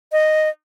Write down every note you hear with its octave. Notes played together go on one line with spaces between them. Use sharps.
D#5